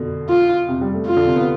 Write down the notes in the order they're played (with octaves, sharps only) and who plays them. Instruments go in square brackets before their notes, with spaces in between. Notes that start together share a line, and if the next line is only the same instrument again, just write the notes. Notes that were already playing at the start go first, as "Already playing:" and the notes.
Already playing: [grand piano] B2 D3
[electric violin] F4
[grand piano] C3
G3
A3
[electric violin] F4
[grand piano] D3
C3
B3